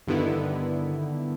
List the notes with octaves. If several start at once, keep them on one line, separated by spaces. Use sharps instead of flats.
G2 D3 D#3 B3 E4